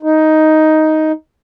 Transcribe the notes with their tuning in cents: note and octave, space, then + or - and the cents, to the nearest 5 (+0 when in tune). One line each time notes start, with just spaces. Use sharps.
D#4 +5